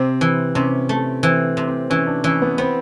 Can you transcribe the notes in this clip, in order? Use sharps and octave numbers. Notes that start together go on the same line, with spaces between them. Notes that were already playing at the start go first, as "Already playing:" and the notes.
Already playing: C3 C4
E3
C3 C#4
A3
E3 C4
C3
C4
E3 C#4
D4
E3 C#4
B3
B3 C4